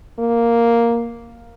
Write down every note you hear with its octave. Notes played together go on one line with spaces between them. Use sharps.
A#3